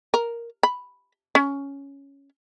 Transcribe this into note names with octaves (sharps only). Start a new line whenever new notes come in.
A#4
B5
C#4